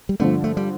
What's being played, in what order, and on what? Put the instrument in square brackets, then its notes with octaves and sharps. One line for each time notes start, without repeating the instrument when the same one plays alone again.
[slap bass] G3
[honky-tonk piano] G2 D3 F3 [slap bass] A3
[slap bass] A3
G3